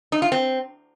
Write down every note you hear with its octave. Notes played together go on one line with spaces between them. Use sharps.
D#4
F4
C4